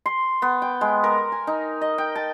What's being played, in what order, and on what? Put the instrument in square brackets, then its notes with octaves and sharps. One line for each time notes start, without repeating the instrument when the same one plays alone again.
[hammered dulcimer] C6
B3
G5
G#3
A#4
G#5
D#4
D#5
G5
A5